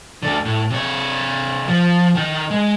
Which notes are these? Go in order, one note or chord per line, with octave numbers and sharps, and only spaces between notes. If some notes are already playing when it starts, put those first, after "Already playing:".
D2 D3
A2
C3 C#5
F3
D#3 D#4
G#3